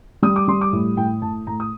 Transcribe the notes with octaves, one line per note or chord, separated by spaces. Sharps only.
G3 D#6
D6
G3 C6
D6
A2
A2 G5
A2 A5
A2 A#5
D#6